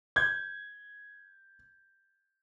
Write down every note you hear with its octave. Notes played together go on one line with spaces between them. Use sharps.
G6 G#6